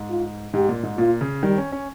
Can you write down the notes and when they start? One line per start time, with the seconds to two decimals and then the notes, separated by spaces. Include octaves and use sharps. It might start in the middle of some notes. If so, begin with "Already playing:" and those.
Already playing: G#2
0.10 F4
0.54 G#2 G4
0.69 A#2
0.83 G#2
0.98 A#2 F4
1.21 C#3
1.43 D#3 G3
1.58 C#4
1.72 C#4